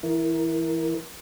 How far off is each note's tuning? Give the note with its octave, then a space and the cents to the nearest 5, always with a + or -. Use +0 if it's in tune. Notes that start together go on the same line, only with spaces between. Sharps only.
E3 +0 E4 +0 A#4 +15